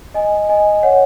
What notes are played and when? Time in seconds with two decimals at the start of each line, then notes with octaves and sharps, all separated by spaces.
0.14 D#5 G#5
0.49 D#5 G#5
0.83 C#5 F#5